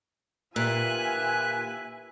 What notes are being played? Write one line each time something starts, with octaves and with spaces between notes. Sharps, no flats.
A#2 F4 G4 B4 E5 G#5 F#6